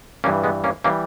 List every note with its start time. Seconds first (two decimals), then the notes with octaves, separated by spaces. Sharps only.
0.24 G2 E3 G3 A#3 C#4
0.44 G#3 B3
0.64 A#3 C#4
0.84 E3 G3 A#3 C#4